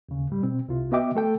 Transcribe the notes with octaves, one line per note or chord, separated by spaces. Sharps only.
D#2 C#3
G#2 G3
B2 C4
C2 C3 F4
B3 F#4 D#5 E5 G5 D6
A3 A4 G5